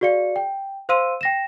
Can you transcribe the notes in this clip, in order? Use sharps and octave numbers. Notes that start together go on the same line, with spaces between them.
F#4 G#4 D5 F5 C#7
G5
C5 F5 C6 E6 D#7
G5 A#6 E7